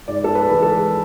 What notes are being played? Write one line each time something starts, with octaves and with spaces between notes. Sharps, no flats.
G#2 D5
A4
B4
E3 G#3
A4